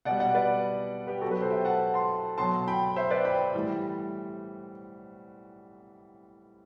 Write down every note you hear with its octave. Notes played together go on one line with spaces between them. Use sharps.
B2 D5 F#5
G3
D5 F#5
B4 D5
G4 B4
B2 F#3 F#4 A4
G4 B4
A4 C5
E5 G5
F#5 A5
A5 C6
B2 F#3 A5 C6
G5 B5
C5 E5
B4 D5
G5 B5
A2 E3 G3